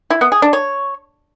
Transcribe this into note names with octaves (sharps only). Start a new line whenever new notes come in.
E4
B3
G#4
D4
C#5